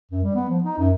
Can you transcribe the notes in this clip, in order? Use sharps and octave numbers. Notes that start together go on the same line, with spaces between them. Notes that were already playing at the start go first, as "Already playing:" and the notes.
F#2
G3
B3
F3
D#4
F#2